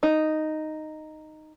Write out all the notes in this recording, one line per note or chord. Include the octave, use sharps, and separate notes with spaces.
D#4